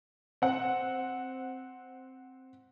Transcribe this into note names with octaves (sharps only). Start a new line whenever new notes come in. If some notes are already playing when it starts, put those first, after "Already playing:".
C4 F#5